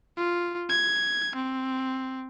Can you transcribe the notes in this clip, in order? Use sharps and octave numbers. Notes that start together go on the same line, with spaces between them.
F4
G#6
C4